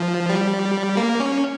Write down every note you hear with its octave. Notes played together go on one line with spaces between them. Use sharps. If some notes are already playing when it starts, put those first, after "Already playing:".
Already playing: F3
G3
A#3
C#4